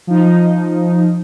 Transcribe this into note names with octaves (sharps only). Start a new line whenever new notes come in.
F3 D#4